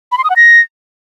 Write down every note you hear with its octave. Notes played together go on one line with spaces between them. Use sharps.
B5
C6
D#6
F#5
A#6